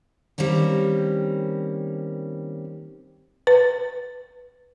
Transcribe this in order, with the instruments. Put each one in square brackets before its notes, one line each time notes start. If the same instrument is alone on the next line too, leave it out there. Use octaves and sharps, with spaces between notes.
[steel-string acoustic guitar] D#3 G3 A#3 C4 C#4
[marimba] B4